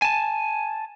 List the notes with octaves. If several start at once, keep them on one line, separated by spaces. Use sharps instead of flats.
G#5 A5